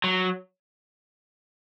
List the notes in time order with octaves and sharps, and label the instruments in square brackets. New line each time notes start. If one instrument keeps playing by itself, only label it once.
[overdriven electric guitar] F#3